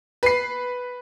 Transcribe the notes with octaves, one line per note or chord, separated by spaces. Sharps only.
B4 C7